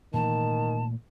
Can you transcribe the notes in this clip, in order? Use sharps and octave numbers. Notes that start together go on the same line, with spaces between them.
A#2 D#3 E3 A3 A5